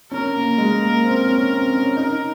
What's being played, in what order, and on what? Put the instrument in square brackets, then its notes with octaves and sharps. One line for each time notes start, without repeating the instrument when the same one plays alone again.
[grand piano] C#4 [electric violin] A#4
[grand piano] A#3
G#3
A#3
C4
C#4
C4
C#4
[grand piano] D#4 [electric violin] A#4